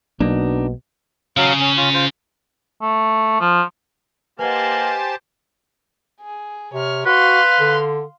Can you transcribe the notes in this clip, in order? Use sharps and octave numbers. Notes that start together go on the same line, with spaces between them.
B1 B2 F#3 A#3 D4 D#4
C#3 F#3 F5
C#4
C#4 F4
F4 C5
A3
F3
A#3 G4 B4 C5 D#5 F#5 G#5 A5
G#4
C3 C#5 F6
F#4 B4 F5 C6
D3